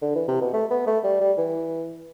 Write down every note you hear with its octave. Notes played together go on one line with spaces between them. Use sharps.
D3
E3
C3
B2
A3
B3
A3
G3
G3
E3